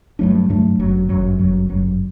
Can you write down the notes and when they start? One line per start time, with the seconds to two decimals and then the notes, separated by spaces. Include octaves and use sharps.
0.19 G2 F#3 A3 D4
0.49 G2 F#3 A3 D4
0.79 G1 F#2 F#3
1.09 G1 F#2 F#3
1.39 G1 F#2 F#3
1.69 G1 F#2 F#3